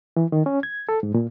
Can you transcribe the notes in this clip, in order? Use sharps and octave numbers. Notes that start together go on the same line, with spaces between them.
E3
D#3
C#4
G#6
A4
G#2
A#2